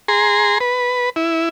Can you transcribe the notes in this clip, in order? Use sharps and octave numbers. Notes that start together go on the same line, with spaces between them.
G#4 A#5 C6
B4
E4